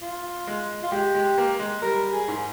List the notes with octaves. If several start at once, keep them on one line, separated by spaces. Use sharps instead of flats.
F4
G#3
F4
G#3 G4
G#3
A#3
G#3
G3 A#4
G#4
G#2